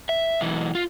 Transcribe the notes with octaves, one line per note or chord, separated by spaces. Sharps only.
E5
B1 E3
F4